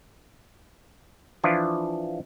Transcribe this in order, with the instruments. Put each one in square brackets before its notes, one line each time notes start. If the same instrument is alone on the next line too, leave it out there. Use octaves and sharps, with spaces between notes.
[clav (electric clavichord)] E3 F3 D4 E4 F4